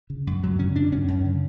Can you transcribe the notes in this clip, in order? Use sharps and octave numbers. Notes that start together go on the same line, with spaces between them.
C#3
F#2
F#2 F#3
C#3 C#4
C#3 D4
F#2 C#4
F#2
C#3